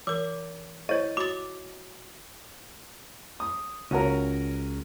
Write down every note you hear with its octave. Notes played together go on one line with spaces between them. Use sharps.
E3 A#4 D6
E4 C#5 D#5
F#4 D6 A6
D#6
C#2 C#4 F#4 A#4